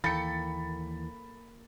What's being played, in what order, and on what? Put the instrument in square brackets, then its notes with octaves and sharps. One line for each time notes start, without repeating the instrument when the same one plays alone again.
[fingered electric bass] D#2 E3 [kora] A#3 A4 G5 [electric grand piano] B5 [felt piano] A6 C#7